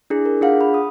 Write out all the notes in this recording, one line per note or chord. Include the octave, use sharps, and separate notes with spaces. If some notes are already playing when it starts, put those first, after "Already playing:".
D4 E4 G#4
A#4
D4 F4 G#4 F5 F#5
B5
D#6